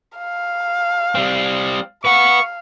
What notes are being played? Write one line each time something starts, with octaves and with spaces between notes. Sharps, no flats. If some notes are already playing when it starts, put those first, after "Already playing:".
F5
G3 C4
B4 F5 F#5 C#6